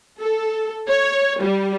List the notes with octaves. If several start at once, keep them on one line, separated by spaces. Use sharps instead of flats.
A4
C#5
G3